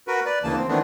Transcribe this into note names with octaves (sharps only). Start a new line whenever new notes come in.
F#4 A#4 B4
B4 D5
D2 C#3 E3 A#3 A5
C4
D#3 E3 A3 B3 C4 D4